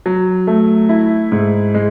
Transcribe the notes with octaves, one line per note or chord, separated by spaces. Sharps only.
F#3
A3
E4
G#2
G#3